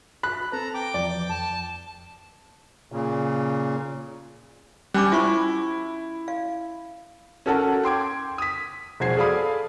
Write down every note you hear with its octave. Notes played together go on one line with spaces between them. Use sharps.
B5 F#6
C4 A4 B4 A#5
G5 D6
E2 F3 D5
F2 A5
A#2 C#3
G3 C#4 D4 D6
E4 F4 C5 C#6
F5
C#4 F#4 A4 A#4 F#5 A5
G5 C6 D6 G#6
D#6 B6
E1 F3 F4 F#4 G#6 C7
G#4 A4 D5 F5 B5 D#6